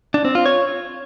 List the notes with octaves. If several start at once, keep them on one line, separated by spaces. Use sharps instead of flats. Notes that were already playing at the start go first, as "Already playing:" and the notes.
D4
C4
F4
C#5